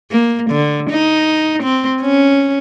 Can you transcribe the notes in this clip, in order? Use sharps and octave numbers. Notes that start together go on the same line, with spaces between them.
A#3
D3
D#4
C4
C#4